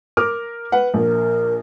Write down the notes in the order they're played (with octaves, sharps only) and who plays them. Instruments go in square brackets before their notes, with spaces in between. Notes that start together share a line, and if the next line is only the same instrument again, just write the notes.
[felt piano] A#4 D6 F6
B4 F#5
[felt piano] A#1 [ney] A#4